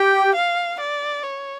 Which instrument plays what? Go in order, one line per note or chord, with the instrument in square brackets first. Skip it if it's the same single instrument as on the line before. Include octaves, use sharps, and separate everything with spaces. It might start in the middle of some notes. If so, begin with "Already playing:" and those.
Already playing: [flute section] G4 [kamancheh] G5
[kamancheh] F5
D5
C#5